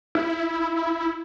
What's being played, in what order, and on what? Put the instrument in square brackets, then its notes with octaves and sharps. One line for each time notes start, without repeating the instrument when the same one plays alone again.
[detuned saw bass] E4